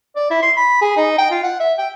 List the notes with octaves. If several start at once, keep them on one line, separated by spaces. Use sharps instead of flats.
D5
E4
C6
B5
G#4
D#4
G5
F4
F#5
E5
G5